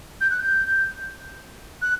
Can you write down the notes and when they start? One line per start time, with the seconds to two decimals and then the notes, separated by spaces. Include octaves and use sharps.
0.21 G6
0.30 F#6
0.40 G6
1.82 F#6